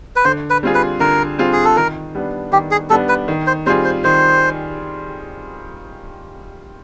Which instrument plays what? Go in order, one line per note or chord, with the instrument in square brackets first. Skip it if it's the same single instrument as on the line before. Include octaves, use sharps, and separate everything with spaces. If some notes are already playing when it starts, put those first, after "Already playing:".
[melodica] B4
[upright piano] D3 [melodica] C5
[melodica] B4
[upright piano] G3 C4 F4 G#4
[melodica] B4
[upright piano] D3 [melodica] A#4
[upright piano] G3 C4 F4 G#4
[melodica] G#4
A4
[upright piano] D#3 [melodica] A#4
[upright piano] G3 B3 D4
[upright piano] D#3 [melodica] G4
[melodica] G#4
[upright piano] G3 B3 D4 [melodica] A4
[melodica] B4
[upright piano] D#3
[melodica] C5
[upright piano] G3 C4 F4 G#4 [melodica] C5
[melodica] C5
[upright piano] D#3 [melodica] C5